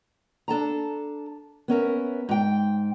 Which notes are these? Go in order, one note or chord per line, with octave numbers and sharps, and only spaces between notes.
D4 A4 A5 A#5
B3 C#4 A#4 E5
G#2 G5